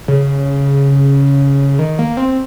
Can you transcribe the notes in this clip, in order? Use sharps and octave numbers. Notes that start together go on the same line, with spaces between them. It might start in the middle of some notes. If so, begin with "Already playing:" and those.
C#3
D#3
A#3
C4